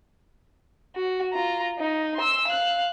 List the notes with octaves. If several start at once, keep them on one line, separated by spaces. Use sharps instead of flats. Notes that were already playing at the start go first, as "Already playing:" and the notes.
F#4
F4 A#5
D#4
C6 E6
F5 F#6